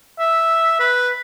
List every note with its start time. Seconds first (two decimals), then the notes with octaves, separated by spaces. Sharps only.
0.19 E5
0.80 B4